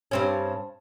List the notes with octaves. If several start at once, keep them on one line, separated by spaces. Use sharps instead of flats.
G2 C4 C#4